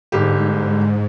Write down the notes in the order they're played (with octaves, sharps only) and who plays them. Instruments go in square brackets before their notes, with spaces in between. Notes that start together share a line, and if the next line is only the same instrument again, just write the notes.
[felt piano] G1 G4 [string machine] G#2